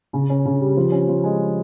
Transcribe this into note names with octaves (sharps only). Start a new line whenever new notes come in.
C#3
C#4
C#3
G3
F3
C#4
F3
G#3